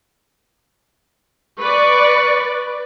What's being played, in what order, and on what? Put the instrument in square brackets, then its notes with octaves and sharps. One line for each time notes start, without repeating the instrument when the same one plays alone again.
[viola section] B4 D5 [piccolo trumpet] C#6